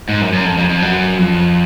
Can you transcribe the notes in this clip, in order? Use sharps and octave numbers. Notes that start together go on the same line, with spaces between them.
G#2
F#2
F#2
F2
F2
F2
F#2
F2